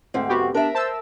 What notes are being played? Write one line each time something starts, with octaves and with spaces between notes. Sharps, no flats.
D2 G#2 C4
B3 F#4 G4
D4 A#4 E5
C5 A5 E6